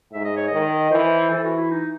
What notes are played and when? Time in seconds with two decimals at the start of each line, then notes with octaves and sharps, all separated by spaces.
0.13 G#2 E5
0.25 D#5
0.37 C#5
0.48 D#3 D#5
0.91 E3 C5
1.30 E3 A4
1.44 F#4
1.57 E4
1.71 D#4